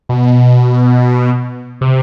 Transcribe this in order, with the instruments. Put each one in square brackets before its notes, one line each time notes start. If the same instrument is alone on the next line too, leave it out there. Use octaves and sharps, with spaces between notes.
[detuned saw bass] B2
C3